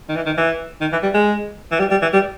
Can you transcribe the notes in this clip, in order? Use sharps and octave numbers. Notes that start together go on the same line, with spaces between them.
D#3
E3
D#3
E3
D#3
E3
G3
G#3
E3
G3
G3
E3
G3